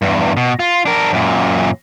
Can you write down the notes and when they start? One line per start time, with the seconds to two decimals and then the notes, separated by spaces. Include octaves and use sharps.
0.02 E2 G2
0.37 B2
0.60 F4
0.86 D4 A#4
1.13 F#2 A#2